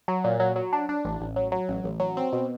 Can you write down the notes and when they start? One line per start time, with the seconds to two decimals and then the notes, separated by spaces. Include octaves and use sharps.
0.08 F#3
0.24 A#2
0.40 F#3
0.56 F#3
0.73 D4
0.89 D4
1.05 A1
1.21 A1
1.36 F#3
1.52 F#3
1.69 A1
1.84 A1
2.00 F#3
2.17 C4
2.33 B2